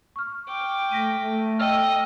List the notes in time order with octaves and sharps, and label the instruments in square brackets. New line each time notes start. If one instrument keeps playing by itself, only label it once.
[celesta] C#6 F6
[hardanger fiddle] G5 D6
[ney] A3 [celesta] A#6 B6 D#7
[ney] A3
[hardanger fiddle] D#5 [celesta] G5 E6 F6